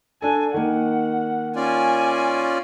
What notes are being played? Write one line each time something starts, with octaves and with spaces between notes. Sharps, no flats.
D4 A4 G#5
D#3 A#3 F#5
C#4 F4 D5 G#5